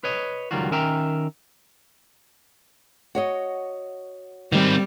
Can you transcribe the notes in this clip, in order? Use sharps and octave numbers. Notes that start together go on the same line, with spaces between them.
B4 C#5 D#5
C#2 D#3 F#3 G3 F4 F#4
D#3 C#4 A#4 E5 G5 A#5
F#4 C#5 D#5
D#3 G3 C4